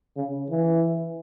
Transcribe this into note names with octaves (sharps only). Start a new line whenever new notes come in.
C#3
E3